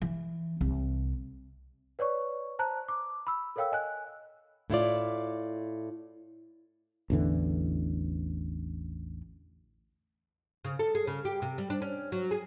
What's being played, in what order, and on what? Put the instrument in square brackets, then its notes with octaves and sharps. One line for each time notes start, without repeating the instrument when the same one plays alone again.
[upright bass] E3
C2
[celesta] B4 C#5 D5 C#6
C5 A5 A#5 F#6
D6
B5 E6
A4 A#4 C#5 F5 G5 E6
D#5 G#5 F#6
[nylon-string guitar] A2 E4 F4 D5
[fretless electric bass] A1 E2 D3 E3
[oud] C#3
A4
G#4
C#3
G4
C3
G3
D4
C#4
F#3
G#4